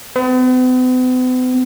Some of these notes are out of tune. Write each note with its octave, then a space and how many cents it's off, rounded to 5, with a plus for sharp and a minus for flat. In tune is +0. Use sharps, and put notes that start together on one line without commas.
B3 +45